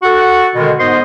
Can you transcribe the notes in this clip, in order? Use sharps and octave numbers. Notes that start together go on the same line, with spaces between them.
F#4 A4 F#5
B2 D3 D#3 G#3
G#2 B3 C5 D#5 C6